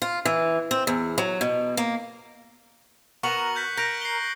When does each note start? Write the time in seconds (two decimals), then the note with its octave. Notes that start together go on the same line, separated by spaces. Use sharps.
0.02 F4
0.25 E3
0.71 C4
0.87 E2
1.18 F#3
1.41 B2
1.77 A#3
3.23 B3 F#4 A#4 C#6 C#7 F#7
3.55 F#6 G6 B6
3.77 A#4 G6 A#6 D7
4.02 C7 G7